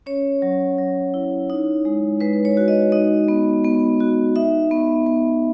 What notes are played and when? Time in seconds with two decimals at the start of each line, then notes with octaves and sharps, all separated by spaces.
0.06 C#4 C#5
0.42 F#3
0.78 F#3
1.14 E4
1.50 D#4
1.85 G#3
2.21 G#3 B4
2.45 C#5
2.57 F#4
2.68 D#5
2.92 D#4 D#5
3.28 B3
3.64 B3
4.00 F#4
4.36 D#4 E5
4.71 B3
5.07 B3